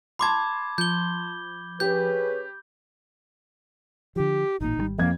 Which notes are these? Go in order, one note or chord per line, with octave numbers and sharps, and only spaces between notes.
A5 B5 C6 D6 G#6
F3 G6 G7
C#4 G4 G#4 B4 G6
D3 F3 G4
A1 A#2 D#4
G#1 C#3 G3
F2 A#3 G#6